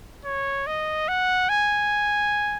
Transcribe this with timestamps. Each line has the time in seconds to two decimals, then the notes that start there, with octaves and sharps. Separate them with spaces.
0.25 C#5
0.67 D#5
1.08 F#5
1.49 G#5